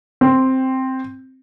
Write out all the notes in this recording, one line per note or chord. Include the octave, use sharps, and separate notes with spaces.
C4